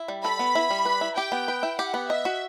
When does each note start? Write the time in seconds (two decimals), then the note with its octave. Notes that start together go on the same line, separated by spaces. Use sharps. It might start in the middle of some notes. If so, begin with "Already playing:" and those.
Already playing: E4
0.08 G3
0.24 A4 B5
0.39 B3
0.55 E4
0.70 G3
0.85 B4
1.01 E4
1.17 G4 G5
1.32 B3
1.48 B4
1.63 E4
1.79 G4 F#5
1.94 B3
2.10 D#5 E5
2.25 F#4